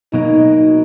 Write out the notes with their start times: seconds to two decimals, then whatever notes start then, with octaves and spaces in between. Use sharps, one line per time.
0.13 B2 F#3 A#3 D#4